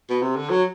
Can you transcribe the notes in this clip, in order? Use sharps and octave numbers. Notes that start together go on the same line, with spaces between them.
B2
C3
D3
F#3